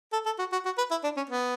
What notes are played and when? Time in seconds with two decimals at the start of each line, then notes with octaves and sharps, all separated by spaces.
0.13 A4
0.26 A4
0.39 F#4
0.52 F#4
0.65 F#4
0.78 B4
0.91 E4
1.04 D4
1.17 C#4
1.29 B3